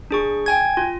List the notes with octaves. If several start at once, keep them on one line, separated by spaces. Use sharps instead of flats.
D4 G#4 C#6
G5 G#5 G#6
F4